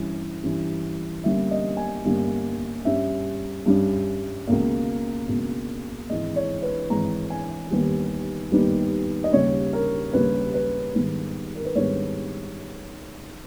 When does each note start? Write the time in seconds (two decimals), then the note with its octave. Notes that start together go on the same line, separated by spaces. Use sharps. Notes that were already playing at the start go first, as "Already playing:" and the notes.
Already playing: G2 E3 G3 C#4
0.43 G2 E3 G3 C#4
1.24 G1 G2 G3 A#3 C#4 E5
1.51 D#5
1.77 G#5
2.04 G1 G2 G3 A#3 C#4
2.85 G2 G3 C#4 E5
3.66 G2 G3 C#4
4.47 C#2 B2 A#3
5.28 C#2 B2 A#3
6.09 G#1 G#2 E3 G#3 D#5
6.36 C#5
6.62 B4
6.90 G#1 G#2 E3 G#3 A#5
7.30 G#5
7.71 D#2 D#3 G3 B3 D#4
8.52 D#2 D#3 G3 B3 D#4
9.24 D#5
9.32 D#2 C#3 G3 C#5
9.73 A#4
10.13 D#2 C#3 G3 B4
10.54 B4
10.95 G#2 D#3 G3 B3
11.55 A#4
11.65 B4
11.75 G#2 D#3 G3 B3 C#5